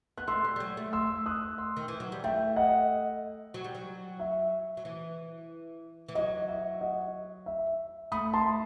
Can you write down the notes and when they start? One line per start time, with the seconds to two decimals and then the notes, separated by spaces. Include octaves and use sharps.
0.18 B3 F#6
0.28 A3 C6 E6
0.44 G3
0.56 G3
0.60 F#3
0.77 A3
0.93 C6 E6
1.26 D#6 F#6
1.58 C6 E6
1.76 D#3
1.88 E3
2.00 F#3
2.12 G3
2.24 A3 E5 G5
2.56 D#5 F#5
3.54 F#3
3.64 G3
3.75 F#3
4.19 E5
4.77 F#3
4.85 E3
6.08 E3
6.15 F#3 D#5
6.49 E5
6.81 D#5 F#5
7.46 E5
8.12 A3 B5 D#6
8.33 A5 C6